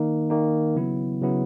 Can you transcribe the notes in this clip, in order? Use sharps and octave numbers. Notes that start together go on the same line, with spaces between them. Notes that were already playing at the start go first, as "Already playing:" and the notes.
Already playing: D#3 A#3 D#4
D#3 A#3 D#4
C#3 F#3 B3 E4
C#3 F#3 B3 E4